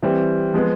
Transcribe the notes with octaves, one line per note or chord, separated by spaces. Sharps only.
E3 G3 C4
F3 G#3 B3